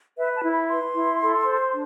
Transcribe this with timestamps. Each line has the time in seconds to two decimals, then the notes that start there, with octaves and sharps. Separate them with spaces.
0.18 B4 E5
0.35 A5
0.43 E4
0.52 B5
0.69 B4 C6
0.95 E4
1.20 A4
1.45 C5
1.71 D4